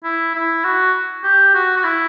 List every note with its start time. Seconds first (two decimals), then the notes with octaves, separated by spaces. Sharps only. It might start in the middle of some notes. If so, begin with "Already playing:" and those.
0.04 E4
0.35 E4
0.64 F#4
1.24 G4
1.54 F#4
1.76 F#4
1.84 E4